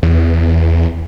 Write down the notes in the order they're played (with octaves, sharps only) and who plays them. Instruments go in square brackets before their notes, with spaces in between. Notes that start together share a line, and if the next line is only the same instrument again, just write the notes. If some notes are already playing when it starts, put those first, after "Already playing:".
[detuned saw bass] E2